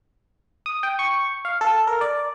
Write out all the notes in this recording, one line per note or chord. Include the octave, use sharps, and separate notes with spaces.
D#6
G5
C#6
F5
A4
A#4
D5